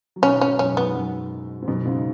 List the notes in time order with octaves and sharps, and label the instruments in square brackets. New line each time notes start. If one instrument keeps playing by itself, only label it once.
[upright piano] F#3
[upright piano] B2 D#3 [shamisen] C#4
[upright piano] G#2 [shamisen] C#4
[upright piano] F#2 B2 [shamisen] C#4
[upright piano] F#2
[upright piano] G#2 [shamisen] B3
[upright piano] F#2
G#2
F#2 B2
G#2 C#3